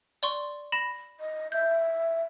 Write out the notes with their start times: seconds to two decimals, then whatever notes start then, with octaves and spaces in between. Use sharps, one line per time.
0.23 D5 C6 C#6
0.72 B5 A#6 E7
1.20 D#5
1.52 E5 G6